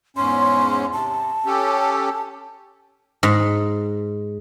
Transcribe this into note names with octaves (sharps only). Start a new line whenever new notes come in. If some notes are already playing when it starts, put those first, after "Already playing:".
E2 G#2 C#4 C6
C3 A5
C#4 G4 A4
G#2